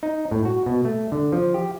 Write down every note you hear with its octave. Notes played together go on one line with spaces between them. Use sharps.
D#4
A2
F#4
B2
A3
D3
F3
G4